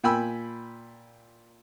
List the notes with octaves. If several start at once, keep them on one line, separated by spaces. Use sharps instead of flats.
A#2 G5 G#5 B5 E6